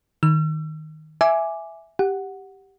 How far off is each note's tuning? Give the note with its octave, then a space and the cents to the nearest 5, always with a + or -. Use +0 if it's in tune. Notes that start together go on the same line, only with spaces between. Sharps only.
D#3 +0 E6 +40
E5 +0 G#5 +0 D6 +0
G4 +0 F#5 +0